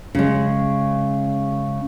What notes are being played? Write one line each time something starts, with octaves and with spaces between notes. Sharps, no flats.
C#3 G#3